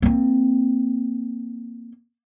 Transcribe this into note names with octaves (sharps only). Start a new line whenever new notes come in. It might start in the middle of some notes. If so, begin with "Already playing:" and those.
A#3 C4